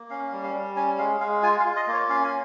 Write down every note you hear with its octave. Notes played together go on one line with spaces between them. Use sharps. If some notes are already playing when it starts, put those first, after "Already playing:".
Already playing: A#3
C#4 F5
G3
F5
G3
C#4 G#5
G#3 F5
G#3 F5
F4 G#5
F5
F4
D#5
A#3
C#5
C#4 F5
G#5